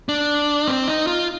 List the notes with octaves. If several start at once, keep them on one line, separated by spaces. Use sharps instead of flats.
D4
C4
D#4
F4